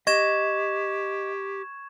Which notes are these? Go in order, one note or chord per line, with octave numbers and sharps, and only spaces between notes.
G4 D#5 C#6 G#6 E7